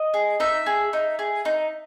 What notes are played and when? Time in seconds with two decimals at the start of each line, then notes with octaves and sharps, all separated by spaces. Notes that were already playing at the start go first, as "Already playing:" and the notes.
Already playing: D#5
0.14 G#4
0.40 D#4 E5
0.66 G#4
0.93 D#4
1.19 G#4
1.45 D#4